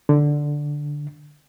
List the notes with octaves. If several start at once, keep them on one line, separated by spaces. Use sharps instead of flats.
D3